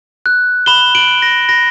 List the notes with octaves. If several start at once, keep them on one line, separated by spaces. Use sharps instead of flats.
F#6
B5 E7 G7
D7 F#7
F#6
A#6
B5 A#6